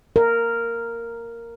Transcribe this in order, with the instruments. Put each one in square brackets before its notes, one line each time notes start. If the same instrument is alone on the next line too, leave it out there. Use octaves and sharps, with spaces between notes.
[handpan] A#4